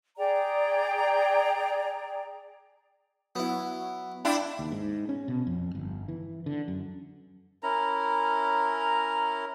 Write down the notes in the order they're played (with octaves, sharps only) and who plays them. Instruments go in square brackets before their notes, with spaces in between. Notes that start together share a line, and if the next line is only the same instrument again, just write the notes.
[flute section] G#4 D5 G5 A#5
[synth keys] F#3 [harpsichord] B3 E4
[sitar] D4 E4 [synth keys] G5 A5 C6
[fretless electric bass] D#2
G#2
C#4
B2
F2
G1
E3
D3
F#2
[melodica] C#4 E4 A#4 A#5